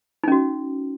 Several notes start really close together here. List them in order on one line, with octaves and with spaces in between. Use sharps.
D#4 C#4 F#4